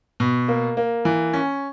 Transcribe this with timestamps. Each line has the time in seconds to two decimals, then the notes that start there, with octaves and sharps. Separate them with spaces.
0.20 B2
0.48 A#3
0.77 A#3
1.05 E3
1.33 C#4